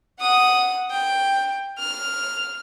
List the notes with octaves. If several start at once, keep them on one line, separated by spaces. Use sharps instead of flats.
F#5 D#6
G5
F6